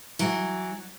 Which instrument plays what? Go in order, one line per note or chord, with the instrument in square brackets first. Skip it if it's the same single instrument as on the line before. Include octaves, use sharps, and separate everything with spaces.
[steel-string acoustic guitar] E3 F#3